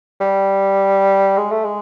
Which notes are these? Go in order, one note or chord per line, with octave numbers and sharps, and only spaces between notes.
G3
G#3
A3
G#3